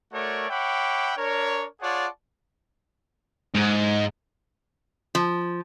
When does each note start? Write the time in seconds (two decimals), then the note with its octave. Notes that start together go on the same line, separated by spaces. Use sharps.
0.13 A3 F#4 A4 A#4 C#5 D5
0.49 C#5 E5 F#5 G5 B5 D6
1.17 D4 A#4 C#5
1.81 F4 G#4 C#5 D5 F#5 A5
3.54 G#2
5.15 F3